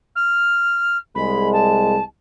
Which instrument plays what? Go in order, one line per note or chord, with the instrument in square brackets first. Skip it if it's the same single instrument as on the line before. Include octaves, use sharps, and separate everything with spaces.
[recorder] F6
[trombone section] C2 G#3 [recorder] B5
[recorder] A5